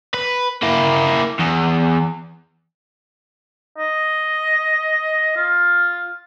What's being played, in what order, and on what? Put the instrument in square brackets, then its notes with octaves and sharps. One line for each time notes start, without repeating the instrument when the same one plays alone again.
[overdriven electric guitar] B4
A#3 E4
E2
[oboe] D#5
F4